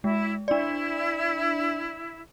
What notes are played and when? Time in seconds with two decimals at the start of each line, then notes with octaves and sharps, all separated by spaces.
0.04 G#3 E4
0.48 D4 E4 D5